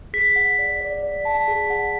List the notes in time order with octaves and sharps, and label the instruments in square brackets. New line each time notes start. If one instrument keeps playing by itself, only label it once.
[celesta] G#4 [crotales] B6
[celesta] F#5
D5
D5
D5
A5
G#4
F#5